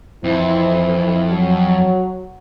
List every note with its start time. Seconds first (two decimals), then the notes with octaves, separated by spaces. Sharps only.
0.24 F2 E3 C4 E4
1.30 F#3